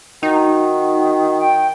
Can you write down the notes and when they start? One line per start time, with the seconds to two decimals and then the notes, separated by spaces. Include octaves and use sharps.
0.23 D#3 D#4 F#4
1.39 G5